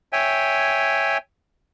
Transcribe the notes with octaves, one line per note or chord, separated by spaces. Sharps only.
C#5 E5 G5 G#5